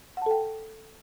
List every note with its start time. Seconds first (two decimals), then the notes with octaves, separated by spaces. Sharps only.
0.17 F#5
0.22 A5
0.26 A4
0.31 G5